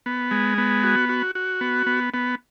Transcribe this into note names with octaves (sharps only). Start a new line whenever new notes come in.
B3
G#3
B3
F#4
F#4
F#4
B3
B3
B3